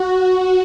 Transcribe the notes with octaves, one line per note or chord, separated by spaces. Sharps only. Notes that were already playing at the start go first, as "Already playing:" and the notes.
Already playing: F#4